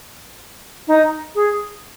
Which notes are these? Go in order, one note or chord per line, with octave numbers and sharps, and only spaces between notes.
D#4
G#4